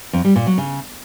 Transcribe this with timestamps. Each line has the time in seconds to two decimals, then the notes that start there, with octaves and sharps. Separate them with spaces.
0.13 F2
0.24 G3
0.36 A#2
0.47 F#3
0.58 C#3